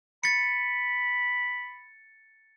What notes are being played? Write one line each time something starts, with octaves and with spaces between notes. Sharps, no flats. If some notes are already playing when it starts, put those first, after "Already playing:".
B5 A6 C#7